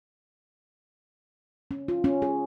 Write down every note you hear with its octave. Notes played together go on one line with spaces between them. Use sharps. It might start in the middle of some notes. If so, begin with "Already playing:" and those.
C#4
F4
C#4
G#4